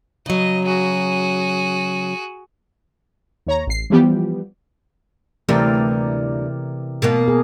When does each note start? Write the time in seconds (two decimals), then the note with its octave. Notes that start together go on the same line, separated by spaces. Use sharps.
0.26 C#3 F#3 D#5
0.65 F#4 G#4
3.47 D#2 C#5 A#5
3.67 A1 C7
3.90 E3 F3 G3 B3 G4
5.49 D2 C3 E3 G3 A3 A#4 D5
7.02 B2 A#3 B3
7.28 G#4